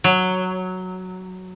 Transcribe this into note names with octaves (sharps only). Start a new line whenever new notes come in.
F#3